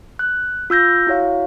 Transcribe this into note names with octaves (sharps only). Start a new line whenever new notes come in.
F#6
F4 E6 G6 A#6
E4 F#4 C#5 F5